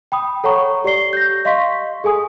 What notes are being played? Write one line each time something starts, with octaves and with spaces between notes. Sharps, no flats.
G5 B5 D#6
A4 C#5 F#5 A#5 C#6
G4 D5 C#6 C7 G7
G6 A#6
D#5 F5 C6 C#6 B6
G#4 A4 G#5 D#6